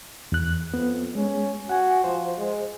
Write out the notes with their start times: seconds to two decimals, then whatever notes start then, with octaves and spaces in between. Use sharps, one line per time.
0.32 E2 F#6
0.74 F2 B3
1.15 G#3 C#4
1.69 F#4 F#5 G#5
2.04 F3 C5
2.38 G#3